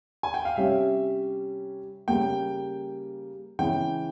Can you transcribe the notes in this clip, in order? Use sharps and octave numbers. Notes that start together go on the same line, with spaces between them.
G#5
G5
F5
C3 G3 C#4 G4 E5
C#3 G3 A#3 G5
C#3 E3 G#3 E4 G5